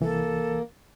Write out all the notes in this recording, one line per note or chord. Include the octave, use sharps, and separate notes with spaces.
C2 E3 A#3 A4